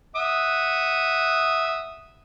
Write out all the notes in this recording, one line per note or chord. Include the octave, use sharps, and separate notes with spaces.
E5 F#5 D#6